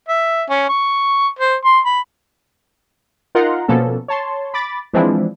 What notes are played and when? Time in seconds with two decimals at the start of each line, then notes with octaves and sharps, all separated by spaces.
0.09 E5
0.50 C#4
0.69 C#6
1.39 C5
1.65 C6
1.85 B5
3.35 D#4 F4 A#4 F#5 A#5 C6
3.68 B2 F3 A#3 B3 C#4 A4
4.08 C#5 A5 C6
4.54 B5 D6 A6
4.93 E3 F3 G#3 C4 D4 E4